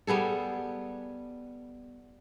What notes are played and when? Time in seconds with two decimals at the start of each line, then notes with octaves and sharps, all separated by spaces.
0.07 G3 B3 G#4 A4